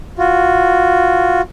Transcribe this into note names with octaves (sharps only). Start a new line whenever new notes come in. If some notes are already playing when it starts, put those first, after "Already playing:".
F4 F#4